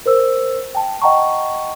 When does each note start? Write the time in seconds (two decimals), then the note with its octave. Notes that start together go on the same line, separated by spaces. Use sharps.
0.06 A#4 C5 E6
0.75 G5 A5
1.02 D#5 F#5 G5 A5 A#5 C#6